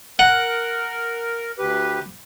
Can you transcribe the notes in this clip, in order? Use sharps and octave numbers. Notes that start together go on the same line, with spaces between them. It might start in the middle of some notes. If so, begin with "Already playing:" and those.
A#4 F#5
D2 G4 B4